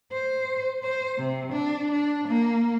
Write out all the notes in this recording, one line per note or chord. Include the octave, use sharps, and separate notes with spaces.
C5
C5
C3
D4
D4
A#3